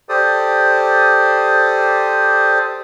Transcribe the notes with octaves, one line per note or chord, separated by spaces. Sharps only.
G4 A4 C5 D5 D#6